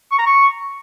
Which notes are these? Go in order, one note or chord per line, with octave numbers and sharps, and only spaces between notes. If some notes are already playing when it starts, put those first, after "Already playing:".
C#6
A#5
C#6